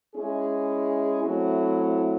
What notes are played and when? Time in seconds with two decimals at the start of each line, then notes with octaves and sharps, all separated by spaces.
0.13 G#3 C#4 E4 G#4
1.23 F#3 A3 C4 E4